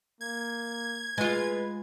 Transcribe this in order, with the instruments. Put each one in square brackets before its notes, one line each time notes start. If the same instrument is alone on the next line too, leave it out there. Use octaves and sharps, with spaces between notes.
[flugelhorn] A#3 [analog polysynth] G#6
[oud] G#3 F4 [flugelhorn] B4